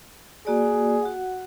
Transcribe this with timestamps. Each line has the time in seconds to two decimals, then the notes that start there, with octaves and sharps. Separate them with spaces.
0.47 A#3 F#4 G#4 D5
1.02 F#4 F#5